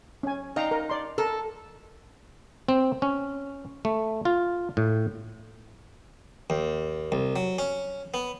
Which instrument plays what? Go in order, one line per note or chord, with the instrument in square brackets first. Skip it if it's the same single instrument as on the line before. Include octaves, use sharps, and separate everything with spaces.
[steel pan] C#4 G#5
[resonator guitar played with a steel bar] D#4 [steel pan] F5 G5 A#5
[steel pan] A#4
D5 C6
[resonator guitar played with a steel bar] A4 [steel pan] A#4
[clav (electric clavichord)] C4
C#4
A3
F4
A2
[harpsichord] D#2
C2
F#3
C#4
B3